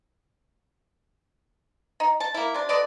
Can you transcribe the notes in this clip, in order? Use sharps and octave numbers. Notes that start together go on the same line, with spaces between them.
D#4
A5
A#3 E4
C3 D4
D3 B4 D5 D#5